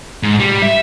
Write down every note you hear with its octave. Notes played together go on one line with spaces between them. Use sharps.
G#2
G3
E5